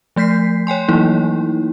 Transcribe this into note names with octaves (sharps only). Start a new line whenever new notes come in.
F3 A3 G6 B6 C7
C#5 G5 G#5 C6
E3 F#3 A#3 D#4 E4